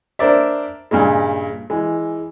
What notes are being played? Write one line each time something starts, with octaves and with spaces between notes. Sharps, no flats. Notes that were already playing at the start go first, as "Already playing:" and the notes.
D4 A#4 C5 D5 E5
G2 A#2 C#3 G#3
E3 G#3